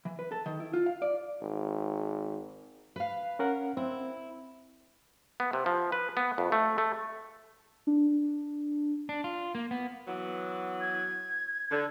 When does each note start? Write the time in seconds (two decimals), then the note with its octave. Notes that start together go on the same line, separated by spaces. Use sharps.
0.05 E3
0.19 B4
0.32 A4
0.46 D#3
0.60 E4
0.73 F4
0.86 F5
1.02 D5
1.42 G#1
2.96 B4 F5
3.39 C#4 A#4 F#5
3.77 C4 E4
5.40 B3
5.53 C3
5.66 F3
5.92 B4
6.17 B3
6.38 F2
6.52 A3
6.78 A3
7.87 D4
9.09 D4
9.24 F4
9.55 A#3
9.71 B3
10.07 E3 F#3 B3
10.81 G#6
11.71 D3